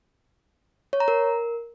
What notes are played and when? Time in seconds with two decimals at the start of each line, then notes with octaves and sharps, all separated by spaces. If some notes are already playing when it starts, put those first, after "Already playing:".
0.93 C#5
1.00 A#5
1.08 A#4